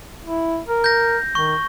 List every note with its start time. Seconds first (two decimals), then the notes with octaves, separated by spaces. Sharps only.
0.25 E4
0.68 A#4
0.84 G6 A#6
1.35 D#3 C#6